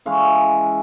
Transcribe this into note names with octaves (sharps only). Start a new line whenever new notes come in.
E3 G#3 C#4 E4 F5